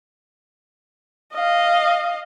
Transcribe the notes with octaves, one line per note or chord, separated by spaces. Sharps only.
D#5 F5